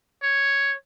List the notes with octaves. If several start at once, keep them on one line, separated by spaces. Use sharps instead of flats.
C#5